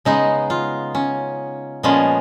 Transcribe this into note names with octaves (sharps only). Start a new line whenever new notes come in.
C#3 G#3 B3 D#4
F4
C#4
A#2 F3 G#3 B3 C#4